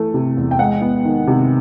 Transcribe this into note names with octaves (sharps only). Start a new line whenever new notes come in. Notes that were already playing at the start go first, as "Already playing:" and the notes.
Already playing: E3 A3
C3
E2
G5
G#3 F#5
B3
D#3
C3